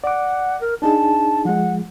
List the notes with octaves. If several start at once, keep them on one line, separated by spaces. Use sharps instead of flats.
D5 F#5 D6
A#4
D4 D#4 G#4 A5
F3 G#3 F#5